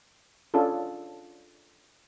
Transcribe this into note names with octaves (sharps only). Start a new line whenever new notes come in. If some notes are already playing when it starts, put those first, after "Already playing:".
C#4 D4 F4 G#4 A4